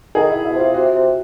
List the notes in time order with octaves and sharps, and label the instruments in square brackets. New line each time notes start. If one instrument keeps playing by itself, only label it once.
[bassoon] D#3 [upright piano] G#4
[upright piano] E4
[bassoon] B2 [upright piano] E4
[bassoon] C3
[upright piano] F4
[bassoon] C3 [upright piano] F#4
[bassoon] C3